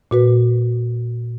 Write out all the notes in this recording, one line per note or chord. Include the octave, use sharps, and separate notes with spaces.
A#2 F#4 B4